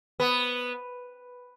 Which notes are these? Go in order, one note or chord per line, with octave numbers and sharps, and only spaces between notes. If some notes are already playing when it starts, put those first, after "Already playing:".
B3